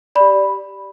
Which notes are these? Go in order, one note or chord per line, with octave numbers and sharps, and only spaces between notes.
G4 D5 B5